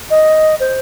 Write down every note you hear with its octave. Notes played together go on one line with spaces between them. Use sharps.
D#5
C5